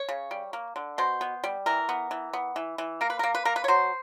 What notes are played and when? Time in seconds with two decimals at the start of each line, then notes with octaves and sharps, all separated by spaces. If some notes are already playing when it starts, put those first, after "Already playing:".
Already playing: C#5
0.09 C#3
0.31 G3
0.53 A#3
0.76 D3
0.98 B2 C5
1.21 B3
1.44 G3
1.66 E3 A#4
1.89 B3
2.11 E3
2.34 B3
2.56 E3
2.78 E3
3.01 A#3 A#4
3.10 B4
3.19 A#3 A#4
3.35 B4
3.45 A#3 A#4
3.56 B4
3.64 C#5
3.68 F#3 C5